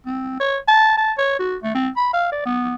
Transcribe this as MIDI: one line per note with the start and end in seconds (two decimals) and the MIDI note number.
0.06 0.35 60
0.40 0.58 73
0.68 0.96 81
0.97 1.12 81
1.18 1.37 73
1.39 1.56 66
1.63 1.74 57
1.75 1.89 60
1.96 2.10 83
2.13 2.28 77
2.32 2.42 74
2.45 2.75 59